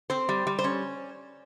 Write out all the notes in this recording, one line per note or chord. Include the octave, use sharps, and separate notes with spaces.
C4 C5
G3
G3
C5
C#4